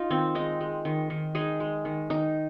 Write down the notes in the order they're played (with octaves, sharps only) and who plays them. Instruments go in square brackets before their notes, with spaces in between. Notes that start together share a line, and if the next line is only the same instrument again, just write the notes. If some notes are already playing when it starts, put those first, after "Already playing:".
Already playing: [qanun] D#4 F4
D#3 C4
G#3 D#4
G#3
D#3
D#3
G#3 D#4 G#4
G#3
D#3
D#3 D#4